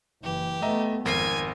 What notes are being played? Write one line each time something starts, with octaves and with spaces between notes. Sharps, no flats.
F#1 E3 G4
A3 B3 D#5 E5 A#5
G#1 F2 A#4 G#5 C7